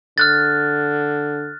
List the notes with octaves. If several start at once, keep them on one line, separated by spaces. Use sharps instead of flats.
D3 F6 F#6 A6